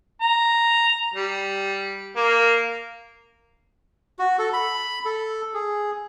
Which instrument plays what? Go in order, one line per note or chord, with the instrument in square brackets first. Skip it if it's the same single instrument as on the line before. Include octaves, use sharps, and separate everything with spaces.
[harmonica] A#5
G3
A#3
[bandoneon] F#4
A4
B5
A4
G#4